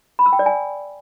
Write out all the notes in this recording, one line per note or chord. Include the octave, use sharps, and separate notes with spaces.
B5
E6
G5
D5
G#5